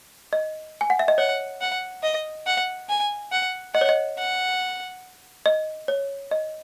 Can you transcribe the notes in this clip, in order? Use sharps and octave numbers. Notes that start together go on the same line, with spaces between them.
D#5
G#5
F#5
E5
D#5
C#5 F#5
F#5
D#5
F#5
G#5
F#5
D#5 F#5
C#5
D#5
F#5
D#5
C#5
D#5